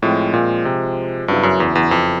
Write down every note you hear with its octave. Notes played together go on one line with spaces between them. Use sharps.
A2 F3 G#3 C4
A#2
C3
G2 C#3 F#3 B3 E4
F#2
E2
E2
F2